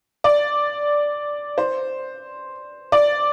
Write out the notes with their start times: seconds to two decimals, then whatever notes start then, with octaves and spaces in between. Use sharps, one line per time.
0.24 D5
1.58 C5
2.92 D5